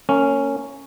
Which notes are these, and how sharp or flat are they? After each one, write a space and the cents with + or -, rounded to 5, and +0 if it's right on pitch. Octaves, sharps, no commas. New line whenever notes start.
A#3 -25 C#4 +0